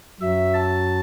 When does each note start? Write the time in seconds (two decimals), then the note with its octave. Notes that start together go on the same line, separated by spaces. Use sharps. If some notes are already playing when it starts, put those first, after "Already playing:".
0.21 F#2 F#3 E5
0.54 A5